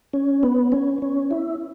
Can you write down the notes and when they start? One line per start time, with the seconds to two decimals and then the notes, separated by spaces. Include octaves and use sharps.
0.13 C#4
0.43 B3
0.72 C#4
1.02 C#4
1.31 E4